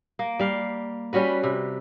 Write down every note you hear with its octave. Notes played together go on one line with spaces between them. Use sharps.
A#3
G3 F5
G3 C#4 F#4 B4
C3